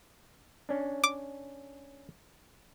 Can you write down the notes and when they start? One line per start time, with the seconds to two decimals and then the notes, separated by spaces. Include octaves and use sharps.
0.69 C#4 D4
1.04 D6